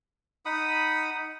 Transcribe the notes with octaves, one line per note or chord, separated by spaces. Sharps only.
D#4 F#5 B5 D#6